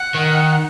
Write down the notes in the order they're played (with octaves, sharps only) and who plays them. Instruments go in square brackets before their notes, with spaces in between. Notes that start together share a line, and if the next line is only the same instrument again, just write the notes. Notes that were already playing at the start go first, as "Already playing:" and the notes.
Already playing: [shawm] F#5
[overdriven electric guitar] D#3